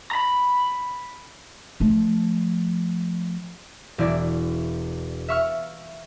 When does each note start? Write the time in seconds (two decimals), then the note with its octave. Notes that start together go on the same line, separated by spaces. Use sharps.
0.11 A#5 B5
1.80 F3 A3
3.98 E1 E4 D5
5.28 E5 F5 C#6 E6 F6